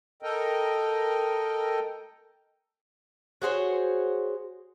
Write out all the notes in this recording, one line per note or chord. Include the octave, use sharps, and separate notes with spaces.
A4 A#4 D#5 G5
F#4 G#4 C5 C#5